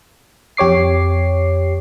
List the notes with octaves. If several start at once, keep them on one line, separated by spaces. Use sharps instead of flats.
F2 G4 C#5 D6 C7